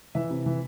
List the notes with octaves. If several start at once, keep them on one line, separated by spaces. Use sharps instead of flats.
E3 E5
C3
E3